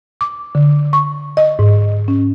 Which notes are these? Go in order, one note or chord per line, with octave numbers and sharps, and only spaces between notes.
D6
D3
C#6
D#5
G#2
C#4